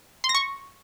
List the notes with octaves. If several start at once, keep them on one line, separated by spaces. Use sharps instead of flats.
C6
A#6
C#6